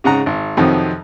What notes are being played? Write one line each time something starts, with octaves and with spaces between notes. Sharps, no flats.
G#2 C#3 F#5 A#5
G#1
F2 C3 D#3 F3 F#3